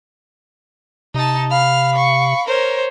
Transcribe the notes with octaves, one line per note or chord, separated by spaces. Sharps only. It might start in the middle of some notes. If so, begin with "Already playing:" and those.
C3 D#4 A5
F5 B5 F6
C#6
A#4 C5 C#5